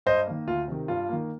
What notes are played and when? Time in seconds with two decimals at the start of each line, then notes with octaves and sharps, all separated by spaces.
0.06 G2 C5 D#5
0.27 D#3 A#3
0.47 D2 F4
0.68 C3 D#3
0.88 G2 F4
1.09 D#3 A#3